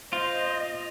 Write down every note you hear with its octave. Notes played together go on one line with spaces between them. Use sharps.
F4 C5 D#5